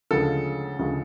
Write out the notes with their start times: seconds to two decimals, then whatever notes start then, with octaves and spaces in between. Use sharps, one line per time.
0.11 D2 C#3 F3 G#3 A4
0.79 D2 C#3 F3 G#3